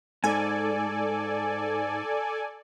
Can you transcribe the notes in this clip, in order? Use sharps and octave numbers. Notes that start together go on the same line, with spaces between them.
G#2 A4 D5 G#5